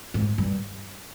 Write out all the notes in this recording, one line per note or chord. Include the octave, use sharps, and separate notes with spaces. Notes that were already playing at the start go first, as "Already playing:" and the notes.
G#2
G2